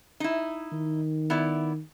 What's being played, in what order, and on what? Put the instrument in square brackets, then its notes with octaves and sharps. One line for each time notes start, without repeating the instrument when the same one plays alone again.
[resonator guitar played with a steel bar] D#4 E4
[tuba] D#3
[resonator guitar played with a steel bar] B3 E4 D5